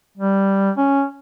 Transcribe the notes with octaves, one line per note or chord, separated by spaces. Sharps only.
G3
C#4